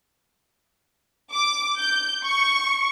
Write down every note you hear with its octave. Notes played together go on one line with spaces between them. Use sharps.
D6
G6
C#6